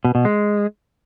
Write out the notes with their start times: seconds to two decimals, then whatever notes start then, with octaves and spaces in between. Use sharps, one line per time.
0.05 B2
0.15 B2
0.25 G#3